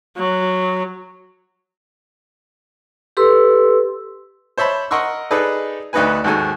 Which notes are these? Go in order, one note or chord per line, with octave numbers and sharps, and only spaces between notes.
F#3
G4 A4 B4 C6 E6
C5 C#5 E5 A5 B5
A#4 D#5 F#5 C6 C#6 E6
D#4 G#4 A4 B4 D5
D2 D4 D#4 F#4 B4 G#5
D#2 G#2 D#3 F#4 A4 G#5